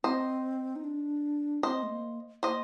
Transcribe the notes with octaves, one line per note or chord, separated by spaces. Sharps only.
C4 C5 D#5
D#4
D4
C4 C5 D#5
A3
A#3
A#3 C5 D#5